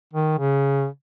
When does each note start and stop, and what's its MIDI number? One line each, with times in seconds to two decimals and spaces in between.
0.14 0.38 51
0.39 0.87 49